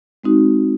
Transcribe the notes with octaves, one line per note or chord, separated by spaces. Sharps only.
G#3 C4 D#4 F#4